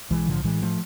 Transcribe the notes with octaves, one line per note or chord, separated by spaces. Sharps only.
B1 E3 G#3
A2 D3 F3
A2 E3 G#3
F3 A3